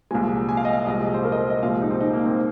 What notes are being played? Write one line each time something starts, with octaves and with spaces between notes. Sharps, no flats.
C2 A#2 F3 G#3 G#5
G#5
F5
D#5
F5
C2 A#2 F3 G#3 D#5
C5
A#4
D#5
C5
D#5
C2 A#2 F3 G#3 F5
D#4
C4
D#4
A#3
C4